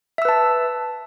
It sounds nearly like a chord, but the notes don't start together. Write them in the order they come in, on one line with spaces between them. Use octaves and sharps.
E5 E6 B4 A5